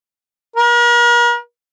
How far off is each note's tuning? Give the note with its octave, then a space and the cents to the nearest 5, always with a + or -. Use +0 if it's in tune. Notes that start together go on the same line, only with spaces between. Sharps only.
A#4 +40